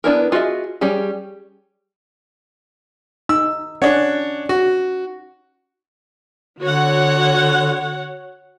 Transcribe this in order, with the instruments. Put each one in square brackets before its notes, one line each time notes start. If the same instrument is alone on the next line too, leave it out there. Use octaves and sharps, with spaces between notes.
[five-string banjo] B3 D4 E4 A#4
F4 F#4 G#4 D#5 E5
G3 C#4 G4 G#4
[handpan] D#4 [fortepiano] E6
[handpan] C#4 F#5 [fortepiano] D4 C#5
[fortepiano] F#4
[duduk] D3 [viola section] F#4 C#5 F#5